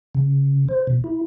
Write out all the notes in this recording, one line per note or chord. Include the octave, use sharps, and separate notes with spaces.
C#3
C5
B2
E4